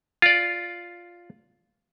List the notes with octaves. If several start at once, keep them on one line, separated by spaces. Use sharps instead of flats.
F4 D5